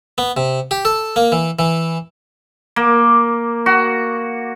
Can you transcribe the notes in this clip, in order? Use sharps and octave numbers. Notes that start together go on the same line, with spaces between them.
B3
C3
G4
A4
A#3
E3
E3
A#3
F#4